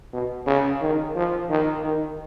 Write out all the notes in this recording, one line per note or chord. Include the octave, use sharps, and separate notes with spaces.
B2
C#3
D#3
F3
D#3
D#3